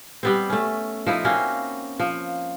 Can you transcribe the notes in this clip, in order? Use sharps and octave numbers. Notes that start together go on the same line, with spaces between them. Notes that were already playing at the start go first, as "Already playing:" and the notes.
G3 B3 C4
A3 C#4
F3 D#4 E4
A#3 C4 C#4 F#4
F3